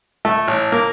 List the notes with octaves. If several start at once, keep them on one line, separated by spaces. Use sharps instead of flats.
A3
A1
A#3